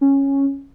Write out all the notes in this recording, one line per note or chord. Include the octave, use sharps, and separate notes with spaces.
C#4